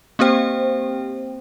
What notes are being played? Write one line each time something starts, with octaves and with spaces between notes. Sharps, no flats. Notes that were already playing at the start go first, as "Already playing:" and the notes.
A#3 C4 G4 C5 G5